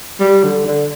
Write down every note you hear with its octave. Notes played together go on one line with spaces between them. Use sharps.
G3
D3
D3